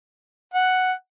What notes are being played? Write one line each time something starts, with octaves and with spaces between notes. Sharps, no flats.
F#5